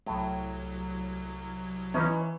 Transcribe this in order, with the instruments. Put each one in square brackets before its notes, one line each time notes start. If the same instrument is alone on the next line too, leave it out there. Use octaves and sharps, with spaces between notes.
[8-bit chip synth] C2 F#3 [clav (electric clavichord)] A2
[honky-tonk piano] E3 [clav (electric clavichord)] C#4 D#4